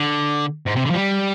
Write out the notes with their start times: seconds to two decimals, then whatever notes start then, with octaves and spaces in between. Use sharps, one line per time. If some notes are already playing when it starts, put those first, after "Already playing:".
Already playing: D3
0.66 G#2
0.76 C3
0.85 D3
0.90 F3
0.94 G3